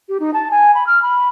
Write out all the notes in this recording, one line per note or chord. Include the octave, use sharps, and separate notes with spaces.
G4
D#4
A5
G#5
B5
F6
B5